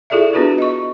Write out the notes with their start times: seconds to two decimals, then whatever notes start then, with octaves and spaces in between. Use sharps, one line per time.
0.10 E4 F4 G#4 A4 D5 E5
0.33 B3 D4 F4 F#4 G#4 B4
0.58 D#5 C#6